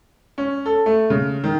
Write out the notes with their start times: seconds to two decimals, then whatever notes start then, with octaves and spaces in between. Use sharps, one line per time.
0.38 C#4
0.66 A4
0.86 A3
1.10 C#3
1.44 D#3